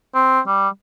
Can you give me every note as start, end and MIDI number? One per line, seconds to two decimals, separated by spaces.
0.15 0.40 60
0.47 0.69 55